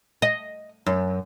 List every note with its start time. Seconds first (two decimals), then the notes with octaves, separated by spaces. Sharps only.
0.22 D#5
0.86 F#2